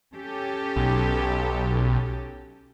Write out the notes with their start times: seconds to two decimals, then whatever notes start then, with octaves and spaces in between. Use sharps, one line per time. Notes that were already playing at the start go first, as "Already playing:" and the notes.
0.14 C#4 G4 A4
0.76 B1